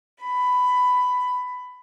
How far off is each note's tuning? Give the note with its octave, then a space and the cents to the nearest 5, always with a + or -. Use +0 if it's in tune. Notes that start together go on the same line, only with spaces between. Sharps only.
B5 +10